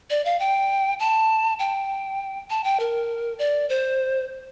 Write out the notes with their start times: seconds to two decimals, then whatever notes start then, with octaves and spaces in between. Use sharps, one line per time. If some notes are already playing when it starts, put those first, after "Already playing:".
0.10 D5
0.25 F5
0.40 G5
1.00 A5
1.59 G5
2.50 A5
2.64 G5
2.80 A#4
3.39 D5
3.69 C5